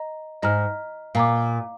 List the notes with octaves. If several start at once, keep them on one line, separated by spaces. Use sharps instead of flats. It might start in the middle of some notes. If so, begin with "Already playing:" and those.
Already playing: D#5 A#5
G#2 D#5 A#5 F6
A#2 F5 A#5 D6